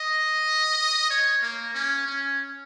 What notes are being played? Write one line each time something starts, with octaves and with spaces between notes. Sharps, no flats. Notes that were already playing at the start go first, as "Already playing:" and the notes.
Already playing: D#5
C#5
A#3
C#4
C#4